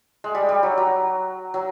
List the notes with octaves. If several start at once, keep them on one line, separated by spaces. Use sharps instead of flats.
G#3
G3
G3
F#3
F#3
F#3